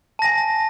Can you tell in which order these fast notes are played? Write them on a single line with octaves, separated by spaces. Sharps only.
A5 A#6 G#5